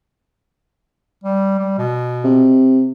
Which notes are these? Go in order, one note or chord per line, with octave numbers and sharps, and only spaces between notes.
G3
G3
B2
C3